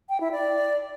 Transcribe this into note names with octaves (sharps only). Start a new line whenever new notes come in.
G5
E4
D5